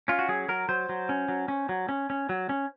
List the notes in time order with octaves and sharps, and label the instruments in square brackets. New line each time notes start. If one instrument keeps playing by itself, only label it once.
[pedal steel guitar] C#4 F4
F#4
F#3 G#4
F#3 A#4
F#3 C5
F#3
C#4
F#3
C#4
F#3
C#4
C#4
F#3
C#4